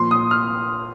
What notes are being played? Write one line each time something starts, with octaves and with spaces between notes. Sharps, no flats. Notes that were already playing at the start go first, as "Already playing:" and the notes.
Already playing: A#2 F3 C6
D#6
F6